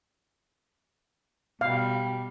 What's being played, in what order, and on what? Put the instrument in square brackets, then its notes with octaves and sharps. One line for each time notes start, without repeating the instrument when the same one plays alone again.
[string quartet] B2 G3 [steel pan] F5